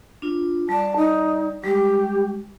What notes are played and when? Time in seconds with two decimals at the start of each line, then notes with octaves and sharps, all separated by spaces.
0.22 D4 F4
0.69 G3 D5 A5
0.97 D#4
1.64 G3 G#3 G4